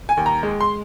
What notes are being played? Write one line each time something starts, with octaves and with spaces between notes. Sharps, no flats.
G#5
D#2
A#5
G#3
C6